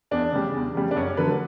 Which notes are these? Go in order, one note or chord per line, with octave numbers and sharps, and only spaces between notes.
E2 D4
C#3 G3
E2
C#3 G3
D4
F#2 C#4
D3 F#3 A3 B4